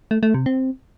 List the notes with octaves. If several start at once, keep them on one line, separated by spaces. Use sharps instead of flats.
A3
A3
C3
C4